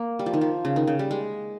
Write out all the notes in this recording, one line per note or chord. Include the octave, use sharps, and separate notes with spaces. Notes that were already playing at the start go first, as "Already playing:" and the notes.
Already playing: A#3
G3
F3
D#3
F3
C#3
D#3
C#3
G3
G#3